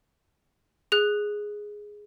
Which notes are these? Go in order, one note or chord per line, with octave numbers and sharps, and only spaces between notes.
G#4 F#6